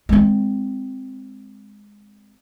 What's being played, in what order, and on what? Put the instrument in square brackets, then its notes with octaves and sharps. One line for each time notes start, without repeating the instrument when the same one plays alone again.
[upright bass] G#3 C4